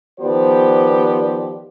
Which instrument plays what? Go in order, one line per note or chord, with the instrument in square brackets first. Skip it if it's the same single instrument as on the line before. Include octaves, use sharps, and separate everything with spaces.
[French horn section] D#3 F3 B3 G4 C5 D5